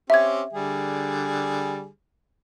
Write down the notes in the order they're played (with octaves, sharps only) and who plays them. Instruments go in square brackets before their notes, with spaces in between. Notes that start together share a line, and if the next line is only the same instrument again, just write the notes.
[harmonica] C4 C#4 G4 [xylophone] E5 G#6
[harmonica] D3 G3 G#4